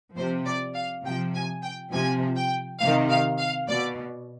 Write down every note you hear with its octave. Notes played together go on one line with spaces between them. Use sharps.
C3 F3 C5
D5
F5
C3 F3 G5
G#5
G5
C3 F3 G#5
G5
C3 D#3 F5
F5
F5
B2 D5